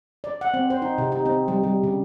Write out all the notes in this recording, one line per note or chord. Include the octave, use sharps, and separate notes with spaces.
D5
F#5
C4
C5
D#4
C3
D#4
C4
G3
G3
C#3